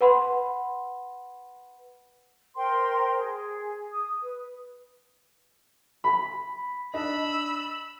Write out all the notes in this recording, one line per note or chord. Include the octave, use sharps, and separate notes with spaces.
B4 F#5 B5 C6
A#4 C5 G5 C6
G#4
D#6
B4
B5
D4 D#5 B5 E6